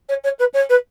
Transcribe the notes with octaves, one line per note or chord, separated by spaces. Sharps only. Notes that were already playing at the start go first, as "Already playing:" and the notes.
C#5
C#5
B4
C#5
B4